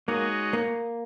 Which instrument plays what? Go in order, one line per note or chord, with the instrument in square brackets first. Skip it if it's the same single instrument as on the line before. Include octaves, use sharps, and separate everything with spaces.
[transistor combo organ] G#3 D#4 F#4 C#5 [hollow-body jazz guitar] A#3
[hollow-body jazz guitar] A#3